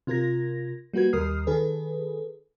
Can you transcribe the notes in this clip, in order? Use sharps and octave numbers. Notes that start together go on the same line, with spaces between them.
C3 F4 A#4 G#6 A#6
G3 A#3 F#4 B4 G#6
D#2 G3 A#4 D#6 F6 C7
D#3 G#4 A4 B4